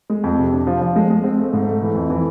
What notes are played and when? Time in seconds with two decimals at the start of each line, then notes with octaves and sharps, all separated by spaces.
0.10 G#3
0.24 F2
0.38 C3
0.52 D4
0.67 F3
0.81 F3
0.96 G#3
1.10 G#3
1.24 C4
1.38 A3
1.53 G#2
1.67 A3
1.82 E3
1.95 F2
2.10 E3